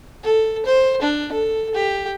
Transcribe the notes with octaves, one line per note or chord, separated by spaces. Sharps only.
A4
C5
D4
A4
G4